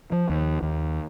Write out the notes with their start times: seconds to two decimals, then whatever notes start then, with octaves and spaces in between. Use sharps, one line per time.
0.12 F3
0.30 D#2
0.62 D#2